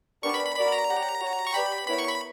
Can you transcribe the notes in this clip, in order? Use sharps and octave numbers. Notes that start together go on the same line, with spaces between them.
B3 D4 G4 A#4 D5 C#6
B5
B5
F#4 A#4 D5 B5
A#5
G4 C#5 F#5
F#4 C#5 F#5
C#6
G4 B4 D5 G5 B5
B3 E4 A#4 C#5 B5
C#6
B5